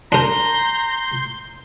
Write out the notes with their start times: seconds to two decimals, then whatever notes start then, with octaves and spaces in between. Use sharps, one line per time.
0.12 D4 A#4 A#5 C6 G6